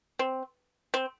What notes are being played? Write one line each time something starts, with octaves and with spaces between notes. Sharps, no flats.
C4
C4